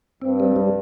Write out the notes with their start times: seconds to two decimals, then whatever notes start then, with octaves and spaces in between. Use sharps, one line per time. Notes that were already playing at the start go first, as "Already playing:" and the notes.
0.22 G2 C4
0.40 G3
0.56 G3